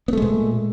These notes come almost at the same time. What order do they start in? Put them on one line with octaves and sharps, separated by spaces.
B3 A3 G#3 A#2